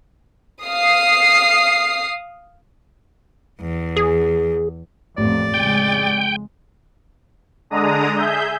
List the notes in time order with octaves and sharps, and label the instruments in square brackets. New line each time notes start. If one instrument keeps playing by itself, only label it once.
[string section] F5 D#6 C7
[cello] E2
[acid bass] G#4
[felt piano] A1 [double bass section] F2 A#3 [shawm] D5
[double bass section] F2 C#3 G#3 [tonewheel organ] G5
[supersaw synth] D3 G#3 D4 A#5 D#6
G#4 E5 G6